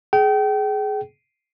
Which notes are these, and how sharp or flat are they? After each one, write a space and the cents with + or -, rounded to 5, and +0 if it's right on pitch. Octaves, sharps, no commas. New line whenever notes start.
G#4 +20 G5 -30